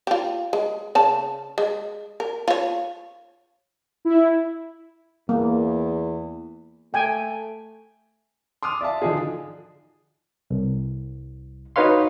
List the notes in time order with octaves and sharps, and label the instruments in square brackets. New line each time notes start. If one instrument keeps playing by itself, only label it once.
[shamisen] F4 G4
G#3
C#3 A5
G#3
A#4
F4 C#5
[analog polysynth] E4
[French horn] E2 [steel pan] A#3
[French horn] A3 [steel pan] G5 G#5
[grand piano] C6 D6 D#6 F6
D5 E5 F5 A5
D3 F3 D4 D#4 G#4
[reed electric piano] C2
D#4 F#4 B4 C#5 F5 C6